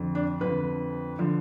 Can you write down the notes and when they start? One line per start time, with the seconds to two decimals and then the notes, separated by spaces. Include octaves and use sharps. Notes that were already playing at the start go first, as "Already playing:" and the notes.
Already playing: F2 D3 F3
0.15 D4
0.41 F2 D3 F3 B4
1.19 D3 F3